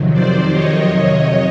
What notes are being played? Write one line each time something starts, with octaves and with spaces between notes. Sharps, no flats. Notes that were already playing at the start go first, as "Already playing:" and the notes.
Already playing: F2 C3 D#3 F#3
C5 D5
C#5 D#5